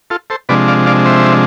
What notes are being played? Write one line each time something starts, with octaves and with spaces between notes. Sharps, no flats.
F4 A4
A4 C5
C3 F3 G#3 D4 B4 D5
D5 F5
D5 F5
C5 E5